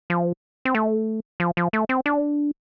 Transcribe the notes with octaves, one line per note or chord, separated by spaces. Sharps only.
F3
C4
A3
F3
F3
A3
C4
D4